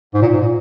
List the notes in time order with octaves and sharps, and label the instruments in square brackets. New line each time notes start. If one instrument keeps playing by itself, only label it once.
[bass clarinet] G#2
A#2
G#2
A#2